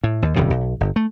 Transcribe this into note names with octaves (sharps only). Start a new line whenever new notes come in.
A2
D#2
D#1 F#2 C3 D#3
B1
G1
A3